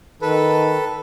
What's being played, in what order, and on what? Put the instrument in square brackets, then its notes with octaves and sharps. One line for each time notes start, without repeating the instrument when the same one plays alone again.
[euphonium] D#3 [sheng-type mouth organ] A4 B4